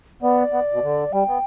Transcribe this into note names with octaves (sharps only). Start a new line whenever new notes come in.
B3 D5
B3
B2
D3
G3 G5
B3